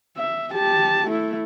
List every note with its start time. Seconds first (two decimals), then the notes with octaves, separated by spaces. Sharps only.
0.17 E5
0.52 G4 A5
1.08 A3 E4